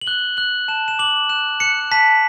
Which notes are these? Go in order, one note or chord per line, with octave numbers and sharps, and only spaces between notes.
F#7
F#6 G7
F#6 F#7
A5 E7
E7
D6 F#7
F#6 E7
F#6 C#7
A5 B6